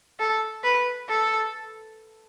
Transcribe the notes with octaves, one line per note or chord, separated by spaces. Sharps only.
A4
B4
A4